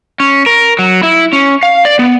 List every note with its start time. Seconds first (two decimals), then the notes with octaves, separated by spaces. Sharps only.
0.20 C#4
0.46 A#4
0.79 F#3
1.03 E4
1.33 C#4
1.63 F5
1.85 D5
1.99 B3